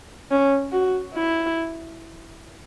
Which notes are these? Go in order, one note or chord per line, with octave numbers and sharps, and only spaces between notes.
C#4
F#4
E4